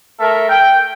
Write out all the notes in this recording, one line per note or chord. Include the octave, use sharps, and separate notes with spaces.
A3 A4 A#4 E5
G5